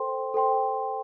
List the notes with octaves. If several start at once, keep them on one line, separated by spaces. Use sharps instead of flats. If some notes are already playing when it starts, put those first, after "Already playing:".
Already playing: A4 C5 G5 C6
A4 C5 G5 C6